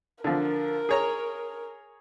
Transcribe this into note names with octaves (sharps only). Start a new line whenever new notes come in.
D3 F3 A#4
G#4 C#5 A#5